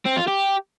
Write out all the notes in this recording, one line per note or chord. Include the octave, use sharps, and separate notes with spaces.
C4
F4
G4